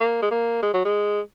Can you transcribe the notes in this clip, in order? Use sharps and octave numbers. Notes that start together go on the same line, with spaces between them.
A#3
G#3
A#3
G#3
F#3
G#3